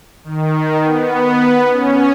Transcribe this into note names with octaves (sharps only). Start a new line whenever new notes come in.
D#3
B3
C#4